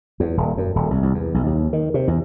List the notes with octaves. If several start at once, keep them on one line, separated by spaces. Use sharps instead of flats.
E2
D#1
F#2
D#1
C2
C2
E2
B1
D#2
D#3
C3
E2